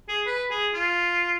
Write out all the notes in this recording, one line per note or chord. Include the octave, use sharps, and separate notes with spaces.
G#4
B4
G#4
F4